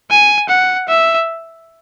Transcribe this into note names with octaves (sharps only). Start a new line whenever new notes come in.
G#5
F#5
E5